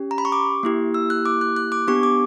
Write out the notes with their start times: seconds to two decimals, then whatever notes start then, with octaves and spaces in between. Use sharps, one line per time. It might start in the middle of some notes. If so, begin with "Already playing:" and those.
Already playing: C#4 G4
0.11 A#5
0.18 B5
0.25 C#6
0.32 D6
0.63 A#3 E4 G4
0.94 E6
1.10 F#6
1.25 D6
1.41 F#6
1.56 F#6
1.72 D6
1.88 B3 D4 G4 C#6
2.03 D6